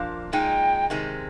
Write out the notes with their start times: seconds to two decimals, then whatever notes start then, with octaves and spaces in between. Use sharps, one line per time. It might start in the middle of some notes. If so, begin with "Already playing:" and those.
Already playing: A#2 F3 A#3 D4
0.33 A#2 G#3 D#4 G5
0.90 C3 D#3 G#3 C4